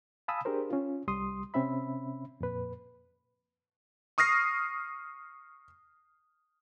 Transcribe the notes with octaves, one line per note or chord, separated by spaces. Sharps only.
F5 G#5 A5 B5 D#6 E6
D4 G4 G#4 A#4 C5
C#4 F4
C2 G3 C6 D#6
C3 C4 C#4 E5 B5
F2 A#2 B4
C#6 D#6 F6 A#6 C7